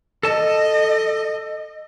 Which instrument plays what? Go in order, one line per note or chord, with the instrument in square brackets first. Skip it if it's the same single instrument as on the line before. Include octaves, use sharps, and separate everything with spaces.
[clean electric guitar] A4 A5 [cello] D#5